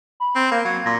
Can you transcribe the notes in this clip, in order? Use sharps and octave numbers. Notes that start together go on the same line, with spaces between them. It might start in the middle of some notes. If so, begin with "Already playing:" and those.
B5
C4
A#3 F5
F#3 G#6
A#2 A#6